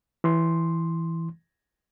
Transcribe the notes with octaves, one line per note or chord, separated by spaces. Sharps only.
E3 C6